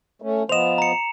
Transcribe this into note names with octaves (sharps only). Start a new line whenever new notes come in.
A3 C#4
F3 B3 C5 D#5 E7 F7
A#5 C#7